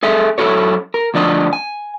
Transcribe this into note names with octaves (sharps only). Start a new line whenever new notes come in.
G#4 A4 E5 G#5
F#2 F#3 E4 F#4 A4 C#5
A#4
D2 F3 D4 D#5
G#5